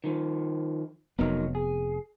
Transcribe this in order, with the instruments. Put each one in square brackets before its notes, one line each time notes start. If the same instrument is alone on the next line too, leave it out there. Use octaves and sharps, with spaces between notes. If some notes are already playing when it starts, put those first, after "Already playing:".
[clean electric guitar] D#3 F3
[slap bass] F1 B3 [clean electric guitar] F#3 D#4 A#4
[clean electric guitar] G#4